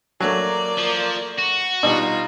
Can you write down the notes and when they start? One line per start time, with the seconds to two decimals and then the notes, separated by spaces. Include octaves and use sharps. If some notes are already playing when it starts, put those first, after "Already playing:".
0.20 F#3 A3 A#3 D5
0.78 F3
1.38 F#4
1.83 B2 G3 D#4 F4